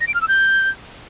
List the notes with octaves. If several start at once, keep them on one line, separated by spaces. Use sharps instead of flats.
A#6
D7
F6
E6
G6